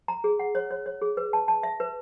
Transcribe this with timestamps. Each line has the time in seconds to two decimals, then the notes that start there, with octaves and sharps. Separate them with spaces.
0.08 A#5
0.24 G#4
0.39 F#5
0.55 C#5
0.71 C#5
0.86 C#5
1.02 G#4
1.17 B4
1.33 A5
1.48 A5
1.63 E5
1.80 B4